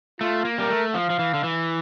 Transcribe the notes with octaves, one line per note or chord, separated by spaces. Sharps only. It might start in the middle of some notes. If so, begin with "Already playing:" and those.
A3 F4
A#3
G3 A#4
A3
F3 F5
F3
E3
D3
E3